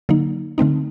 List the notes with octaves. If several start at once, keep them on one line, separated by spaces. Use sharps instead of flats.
D3 F#3 A#3 D#4
D3 A3 C4 D#4